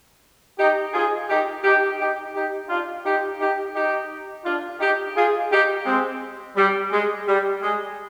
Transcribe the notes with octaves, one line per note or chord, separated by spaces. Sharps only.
D#4 G4
F4 G#4
D#4 G4
D#4 G4
D#4 G4
D#4 G4
D4 F4
D#4 G4
D#4 G4
D#4 G4
D4 F4
D#4 G4
F4 G#4
D#4 G4
G#3 C4
G3
G#3
G3
G#3